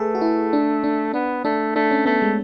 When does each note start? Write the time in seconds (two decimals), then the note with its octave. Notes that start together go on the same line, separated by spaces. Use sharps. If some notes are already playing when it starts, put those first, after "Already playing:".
Already playing: A3 G#4 A4 B4
0.15 F#4
0.21 E4
0.53 D4
0.84 D4
1.14 B3 D4
1.45 A3 D4
1.75 A3 D4
1.91 C#4
2.06 A3 B3
2.22 G#3